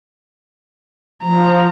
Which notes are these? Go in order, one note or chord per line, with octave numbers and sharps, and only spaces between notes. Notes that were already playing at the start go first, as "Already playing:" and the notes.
F3 A#5